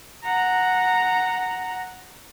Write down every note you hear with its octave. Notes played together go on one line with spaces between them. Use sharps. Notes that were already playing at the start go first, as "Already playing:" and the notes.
F#5 A#5